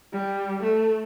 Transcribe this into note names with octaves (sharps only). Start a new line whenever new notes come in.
G3
A3